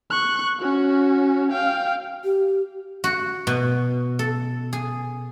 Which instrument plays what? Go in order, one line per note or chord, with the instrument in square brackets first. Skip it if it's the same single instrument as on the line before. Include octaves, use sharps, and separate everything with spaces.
[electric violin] C#6 F#6
C#4 F#4
F5 G5
[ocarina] G4
[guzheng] F#4
B2
A4
G#4